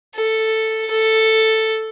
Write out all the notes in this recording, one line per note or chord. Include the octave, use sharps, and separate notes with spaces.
A4
A4